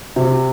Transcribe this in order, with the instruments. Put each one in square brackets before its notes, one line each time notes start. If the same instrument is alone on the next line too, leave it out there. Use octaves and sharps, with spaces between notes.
[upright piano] C3